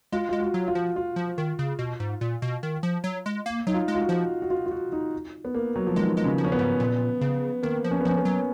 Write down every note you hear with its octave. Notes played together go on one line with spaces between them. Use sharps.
G#3 F4
G#3 F4
F#4
F#3
F4
F3
F4
F3
D#3
C#3
B2
G#2
A#2
B2
D#3
F3
F#3
G#3
A#3
F#3 D#4
F4
G#3
F4
F#4
F3
F#4
F4
F4
F#4
D#4
B3
A#3
F#3
F3
D#3 G#3
G#3
C#3
F3
C#4
B3
G#2
A#2
C#3
D#3 A#3
F3
C#4
B3
F3 C#4
B3
F#3